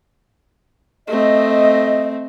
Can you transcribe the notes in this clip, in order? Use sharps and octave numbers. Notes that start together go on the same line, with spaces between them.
A3 C4 D#5